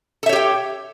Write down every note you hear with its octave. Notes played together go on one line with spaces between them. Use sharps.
G4 A4 C#5 E5 G5